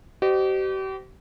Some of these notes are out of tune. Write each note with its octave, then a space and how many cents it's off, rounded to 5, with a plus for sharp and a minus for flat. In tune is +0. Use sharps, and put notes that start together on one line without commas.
G4 -40 C5 -25 D#5 -40